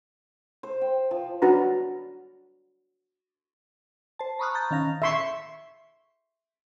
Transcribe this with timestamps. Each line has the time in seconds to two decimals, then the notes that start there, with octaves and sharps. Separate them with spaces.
0.63 C5
0.81 G5
1.11 F3
1.42 D4 F#4 B4 A#5
4.19 C5 A5
4.39 A#5 B5 C#6 D#6 F6 F#6
4.55 A#5 G6 A6
4.71 D#3 C#4 F5 A#6
5.02 E5 C6 C#6